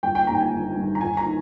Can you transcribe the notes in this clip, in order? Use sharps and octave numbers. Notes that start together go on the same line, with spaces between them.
G1 G5
G5
G2 D#3 A#5
G5
G#5
G1
G2 D#3
A#5
G1 G#5
A#5
D#3